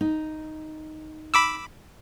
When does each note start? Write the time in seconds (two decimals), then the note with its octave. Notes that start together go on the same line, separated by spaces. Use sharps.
0.01 D#4
1.34 B5 D6 E6